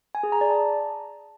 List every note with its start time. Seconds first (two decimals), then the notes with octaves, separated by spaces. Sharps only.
0.15 G#5
0.23 G#4
0.32 A#5
0.41 D5
0.50 A5